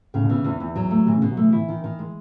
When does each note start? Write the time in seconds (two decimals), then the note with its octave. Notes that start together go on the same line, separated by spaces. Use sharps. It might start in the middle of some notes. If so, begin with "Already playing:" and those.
0.14 A2 C#3
0.24 B2
0.30 D#3 E3
0.44 E2
0.60 E2
0.76 F#3
0.91 A3
1.06 B2 E3
1.17 C#3
1.22 B2
1.31 F#3
1.37 E3 A3
1.52 E3 E4
1.69 D#3
1.84 D#3
1.99 G#3